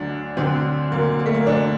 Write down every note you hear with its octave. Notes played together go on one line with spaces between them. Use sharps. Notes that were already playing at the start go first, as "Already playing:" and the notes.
Already playing: D2 D3 F#3 D4
D2 D3 F#3 C4
D2 D3 F#3 A#3
A#3
A3
A#3
D2 D3 F#3 D4